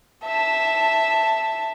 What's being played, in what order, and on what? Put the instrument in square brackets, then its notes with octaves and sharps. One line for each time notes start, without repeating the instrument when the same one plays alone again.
[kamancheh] E5 A5